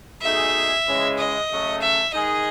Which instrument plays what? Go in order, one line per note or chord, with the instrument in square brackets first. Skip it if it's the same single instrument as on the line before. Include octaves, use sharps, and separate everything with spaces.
[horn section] B2 A3 D#4 G#4 [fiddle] E5
[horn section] C#3 E3 G#3 C#4
[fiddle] D#5
[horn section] C#3 F#3 A3 C#4
[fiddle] E5
[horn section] D#3 G#3 D#4 G#4 [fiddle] D#5